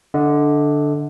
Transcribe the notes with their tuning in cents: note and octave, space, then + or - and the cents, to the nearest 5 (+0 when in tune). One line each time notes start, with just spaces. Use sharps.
D3 +0 D#5 +35